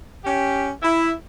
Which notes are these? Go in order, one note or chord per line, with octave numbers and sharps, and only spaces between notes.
C#4 G4
E4